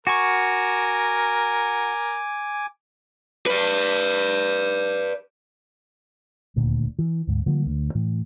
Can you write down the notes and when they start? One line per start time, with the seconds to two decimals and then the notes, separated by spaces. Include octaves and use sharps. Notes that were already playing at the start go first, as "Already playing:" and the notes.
0.07 F#4 A#4 G#5 C#6 D6
3.46 B4 D5
6.56 D#1 D2 A#2
6.99 E3
7.27 D2 G#2
7.46 D3 F3 G3 A#3
7.66 D2
7.95 A2 E3